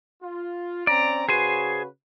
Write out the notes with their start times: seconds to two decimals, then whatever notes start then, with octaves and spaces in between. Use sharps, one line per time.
0.22 F4
0.87 C4 C#4 D5 A#5
1.29 C#3 F#4 G#4 B4 C5 G#5